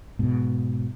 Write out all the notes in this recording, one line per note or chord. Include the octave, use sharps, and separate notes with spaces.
G#2 B2